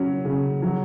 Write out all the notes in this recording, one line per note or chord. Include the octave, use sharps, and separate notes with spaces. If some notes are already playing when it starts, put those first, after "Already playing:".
Already playing: C#3 F#3 C#4
C#3
F#3